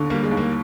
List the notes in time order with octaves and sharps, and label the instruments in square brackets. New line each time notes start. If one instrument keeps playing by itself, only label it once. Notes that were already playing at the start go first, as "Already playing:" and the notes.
Already playing: [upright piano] D#2 D3
[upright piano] G3 [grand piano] A#3
[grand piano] G#3
[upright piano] D#2
[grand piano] A#3